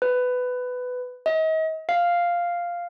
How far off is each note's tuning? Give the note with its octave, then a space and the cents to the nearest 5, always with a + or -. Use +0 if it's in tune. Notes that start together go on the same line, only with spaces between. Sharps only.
B4 +15
D#5 +40
F5 +0